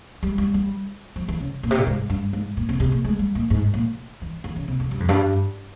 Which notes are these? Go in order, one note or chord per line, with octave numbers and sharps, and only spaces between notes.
G3
G3
G3
F3
E3
C#3
A#2
C3
A#2
G#2
G2
G#2
A#2
C3
C3
A#2
G#3
G3
A#2
G#2
A#2
E3
E3
C#3
C3
F2
G2
F2
G2